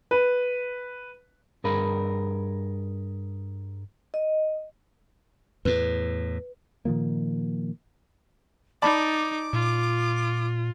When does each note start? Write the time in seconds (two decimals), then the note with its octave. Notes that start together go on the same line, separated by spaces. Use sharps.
0.11 B4
1.64 G2 G#4 A#4 B5
4.14 D#5
5.65 E2 A2 B4
6.85 A#2 D#3 F3 A#3
8.82 D#4 D5 A5 B5 D6
9.53 A#2 F4